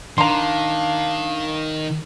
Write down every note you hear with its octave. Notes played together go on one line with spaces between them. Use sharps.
D#3 D4 F5 A#5 C6